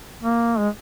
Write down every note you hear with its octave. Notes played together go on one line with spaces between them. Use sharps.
A#3
G#3